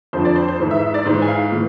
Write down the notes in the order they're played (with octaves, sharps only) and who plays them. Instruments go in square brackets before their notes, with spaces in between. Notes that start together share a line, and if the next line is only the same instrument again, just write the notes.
[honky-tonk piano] F2 D3 F3 C5
D5
C5
C5
G#2 E3
E5
E5
D5
G#2 E3 C5
G#5
F5
A2 E3